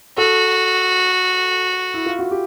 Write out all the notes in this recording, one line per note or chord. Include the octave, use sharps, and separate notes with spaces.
F#4 A4
E4
F4
F#4
G4